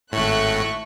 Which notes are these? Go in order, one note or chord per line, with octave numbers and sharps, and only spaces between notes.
G#1 A2 A3 C#6 F#6